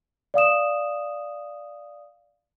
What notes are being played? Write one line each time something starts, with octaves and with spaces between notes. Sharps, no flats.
D5 F5 D#6 E7